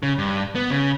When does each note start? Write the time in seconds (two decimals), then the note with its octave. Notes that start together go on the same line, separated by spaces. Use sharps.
0.03 C#3
0.18 G2
0.55 B3
0.70 C#3